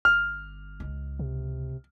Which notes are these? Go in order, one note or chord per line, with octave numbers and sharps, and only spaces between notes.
G1 F6
C#2
C3